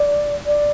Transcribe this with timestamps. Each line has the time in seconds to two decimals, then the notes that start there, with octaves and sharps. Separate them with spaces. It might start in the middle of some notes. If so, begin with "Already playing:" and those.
Already playing: D5
0.46 D5